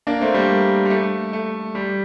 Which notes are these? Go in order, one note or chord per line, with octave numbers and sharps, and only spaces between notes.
A#3 D4
A3 C4
G3 A#3
G3
A3
A3
G3